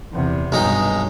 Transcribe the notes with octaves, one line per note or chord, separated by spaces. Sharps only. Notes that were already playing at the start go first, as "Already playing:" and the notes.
E2 C3
B1 G2 G#3 D#4